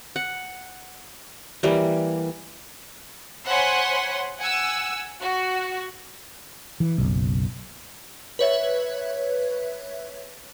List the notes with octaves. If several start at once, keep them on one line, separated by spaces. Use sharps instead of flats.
F#5
E3 G3 A#3
C5 C#5 F#5 G#5 B5 C6
F#5 G#5 E6
F#4
E3
F#1 B1
B4 C#5 E5